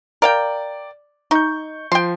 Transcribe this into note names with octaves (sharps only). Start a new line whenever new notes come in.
A#4 D5 F5 G5
D#4 C#6 G6
F3 G5 C6